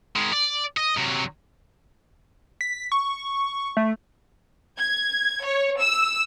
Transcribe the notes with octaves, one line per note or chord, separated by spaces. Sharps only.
D#3 G#3
D5
D#5
C3 F#3
B6
C#6
A3
G#6
C#5
E6